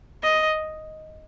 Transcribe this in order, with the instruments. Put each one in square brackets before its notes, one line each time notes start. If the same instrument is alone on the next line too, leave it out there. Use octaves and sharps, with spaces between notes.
[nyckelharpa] D#5